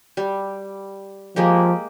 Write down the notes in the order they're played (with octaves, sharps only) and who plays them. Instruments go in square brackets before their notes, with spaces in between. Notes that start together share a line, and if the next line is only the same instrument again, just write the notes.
[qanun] G3
[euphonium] F3 [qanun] G#3 A#3 G4